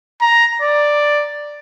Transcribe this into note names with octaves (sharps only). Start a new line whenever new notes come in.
A#5
D5